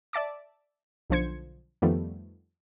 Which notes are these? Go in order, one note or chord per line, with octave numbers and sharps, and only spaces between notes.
D5 E5 A5 D6
B1 D3 F3 C5 G#6 C#7
F2 D#3 F3 G3 A3 B3